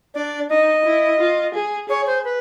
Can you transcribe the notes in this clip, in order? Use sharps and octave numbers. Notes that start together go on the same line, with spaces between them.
D4 D5
D#4 D#5
E4
F4
G#4
G#4 C#5
C5
B4